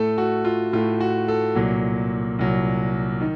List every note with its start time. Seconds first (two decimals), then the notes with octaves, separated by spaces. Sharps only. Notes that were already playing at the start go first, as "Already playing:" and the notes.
Already playing: A2 A3 A4
0.18 F#4
0.45 F4
0.73 A2 A3 F4
1.01 F#4
1.28 A4
1.55 C2 A#2 F#3
2.39 C2 A#2 F#3
3.21 D#3